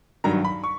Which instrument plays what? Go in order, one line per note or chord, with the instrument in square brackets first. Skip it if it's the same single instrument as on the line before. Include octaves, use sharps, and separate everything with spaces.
[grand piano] G2 D#3 F#3 A#5
B5
C#6